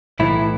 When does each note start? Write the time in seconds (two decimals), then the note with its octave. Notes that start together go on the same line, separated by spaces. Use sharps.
0.19 B1 A2 E3 E4